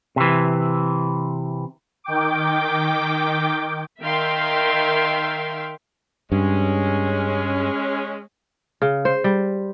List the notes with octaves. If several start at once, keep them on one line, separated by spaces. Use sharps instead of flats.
C3 E3
D#3 G5 D6
D#3 E5 F5 G5 C6
G2 G#3 C#4
C#3
C5
G3